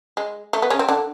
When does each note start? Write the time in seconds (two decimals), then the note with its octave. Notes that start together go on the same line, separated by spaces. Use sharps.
0.17 G#3
0.53 A3
0.62 B3
0.70 C#3 C#4
0.79 C4
0.89 D3 D4